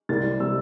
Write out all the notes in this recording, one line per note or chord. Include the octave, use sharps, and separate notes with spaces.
C2 C3 G3 A6
C3 G3 E6